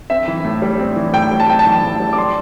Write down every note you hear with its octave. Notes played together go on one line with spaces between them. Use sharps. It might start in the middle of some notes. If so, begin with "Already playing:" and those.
C4 E5
E3
A2
G3
C4
E3
A2 G5
G3
A5
C4 G5
A5
E3
A2
G3
D6
D4 C6